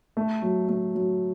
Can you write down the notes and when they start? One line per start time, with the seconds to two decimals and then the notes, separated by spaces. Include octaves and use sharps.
0.17 A3
0.42 F#3
0.69 A3
0.95 F#3